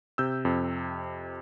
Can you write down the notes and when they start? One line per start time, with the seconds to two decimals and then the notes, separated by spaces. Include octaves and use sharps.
0.18 C3 E6 G6
0.45 F2